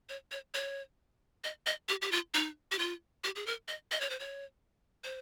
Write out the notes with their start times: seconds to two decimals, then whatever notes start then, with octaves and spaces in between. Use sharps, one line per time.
0.09 C#5
0.31 C#5
0.54 C#5
1.44 D#5
1.66 D#5
1.89 G4
2.02 G4
2.12 F4
2.34 D#4
2.72 G4
2.79 F4
3.24 G4
3.36 G#4
3.47 A#4
3.68 D#5
3.91 D#5
4.01 C#5
4.10 C5
4.20 C#5
5.04 C5